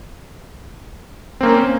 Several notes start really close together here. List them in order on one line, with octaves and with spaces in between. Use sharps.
C4 A#3 C#4